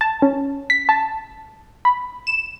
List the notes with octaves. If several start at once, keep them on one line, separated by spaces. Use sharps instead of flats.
A5
C#4
B6
A5
B5
E7